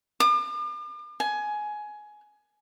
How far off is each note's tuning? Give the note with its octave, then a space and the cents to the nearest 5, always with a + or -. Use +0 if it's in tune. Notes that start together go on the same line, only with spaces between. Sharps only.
D6 +45
G#5 +15